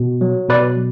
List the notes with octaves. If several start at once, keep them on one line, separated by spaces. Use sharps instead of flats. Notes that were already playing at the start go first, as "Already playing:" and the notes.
Already playing: B2
F#3
B2 B4 D5